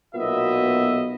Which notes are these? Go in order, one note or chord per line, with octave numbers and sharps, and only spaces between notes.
B1 A#2 B3 F#4 D#5 E5